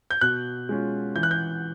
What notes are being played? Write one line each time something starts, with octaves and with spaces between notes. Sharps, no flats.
G6
B2 F#6
G#3 C#4 F4
E3 G6
F#6
G6